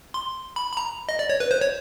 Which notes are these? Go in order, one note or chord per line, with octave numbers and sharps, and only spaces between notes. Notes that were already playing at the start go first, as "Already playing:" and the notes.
C6
B5
B5
A#5
D#5
D5
C#5
B4
C5
C#5